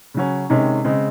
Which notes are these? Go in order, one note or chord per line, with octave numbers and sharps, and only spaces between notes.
C#3 F#3 C#4
C3 D#3 G#3 C#4
C#3 G#3 C4